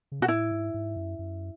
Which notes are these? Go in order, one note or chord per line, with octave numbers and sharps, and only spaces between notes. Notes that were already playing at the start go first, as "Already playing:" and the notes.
C#3
B2 F#4
A2 E4
G#2
G#2
F#2
F#2